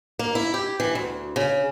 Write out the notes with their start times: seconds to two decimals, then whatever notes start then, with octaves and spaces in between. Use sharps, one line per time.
0.19 A#3
0.35 E4
0.54 G4
0.80 E3
0.95 D2
1.36 C#3